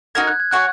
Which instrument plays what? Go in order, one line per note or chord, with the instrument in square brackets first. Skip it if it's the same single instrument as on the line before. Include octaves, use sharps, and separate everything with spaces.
[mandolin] D#4 F#4 A#4 [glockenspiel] G#6
[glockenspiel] F#6
G#6
[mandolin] F#4 C#5 G#5 [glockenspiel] F#6